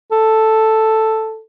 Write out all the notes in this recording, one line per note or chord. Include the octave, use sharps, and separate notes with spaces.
A4